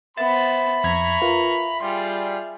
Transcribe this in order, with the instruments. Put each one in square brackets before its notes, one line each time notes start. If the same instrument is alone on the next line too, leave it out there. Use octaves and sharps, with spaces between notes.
[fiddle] B3 C5 [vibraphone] E5 [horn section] B5 [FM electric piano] A6
[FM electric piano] F2 G#6 B6 [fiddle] A#5 C#6
[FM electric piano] F4 A#4 B4
[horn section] G3 [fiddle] F4 G#4 [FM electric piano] C6